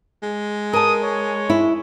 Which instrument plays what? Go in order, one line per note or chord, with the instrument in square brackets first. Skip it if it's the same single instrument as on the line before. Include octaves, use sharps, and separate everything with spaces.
[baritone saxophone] G#3
[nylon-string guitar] A#4 A5 [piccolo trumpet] D#6
[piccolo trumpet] C#5
[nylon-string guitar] E4